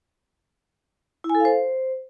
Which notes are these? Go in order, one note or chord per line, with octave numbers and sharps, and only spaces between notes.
E4
G#5
A4
F5
C5